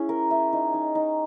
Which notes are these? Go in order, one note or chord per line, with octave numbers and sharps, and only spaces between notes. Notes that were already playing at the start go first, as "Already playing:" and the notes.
Already playing: C#4 E4 G#4
A#4
E5
D#4
D#4
D#4